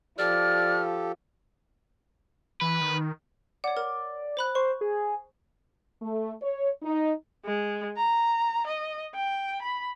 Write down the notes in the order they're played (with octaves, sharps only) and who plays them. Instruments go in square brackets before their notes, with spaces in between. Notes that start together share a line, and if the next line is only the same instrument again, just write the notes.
[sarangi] F3 [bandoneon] G4 A4 [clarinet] D5 [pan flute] F6
[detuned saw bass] E3 [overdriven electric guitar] B4
[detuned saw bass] D#3
[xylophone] C#5 F#5 [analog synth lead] D5
[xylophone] A#4
C5 B5 F#6
[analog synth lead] C5 [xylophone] C#6
[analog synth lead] G#4
[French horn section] A3
C#5
D#4
[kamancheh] G#3
A#5
D#5
G5
B5